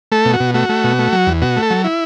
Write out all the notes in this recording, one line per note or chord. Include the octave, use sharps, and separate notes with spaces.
A3 A4
B2
F#4
B2
A3 F#4
A3
B2
A3
F#3
E2
B2 F#4
A3
A4
F#3
E4